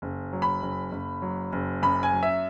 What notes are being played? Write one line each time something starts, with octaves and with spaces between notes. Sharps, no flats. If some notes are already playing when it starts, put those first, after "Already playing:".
F#1
F#3
B5
F#1
F#1
F#3
F#1
F#2 B5
G#5
F#3
E5